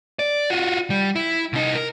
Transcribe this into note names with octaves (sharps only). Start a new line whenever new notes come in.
D5
F4 F#4
G3
E4
C2 D#4
A#4